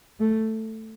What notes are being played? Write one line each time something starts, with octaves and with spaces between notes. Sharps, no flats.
A3